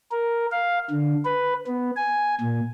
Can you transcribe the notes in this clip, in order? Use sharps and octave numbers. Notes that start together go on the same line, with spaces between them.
A#4
F5
D3
B4
B3
G#5
A#2